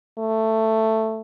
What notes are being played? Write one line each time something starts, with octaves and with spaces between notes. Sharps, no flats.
A3